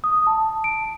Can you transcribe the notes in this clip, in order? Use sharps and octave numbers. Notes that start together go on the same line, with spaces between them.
D#6
A5
D7